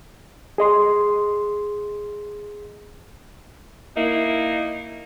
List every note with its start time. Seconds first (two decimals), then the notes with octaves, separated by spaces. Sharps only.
0.58 G#4 D#5 C6
3.96 A#3 D#4 E4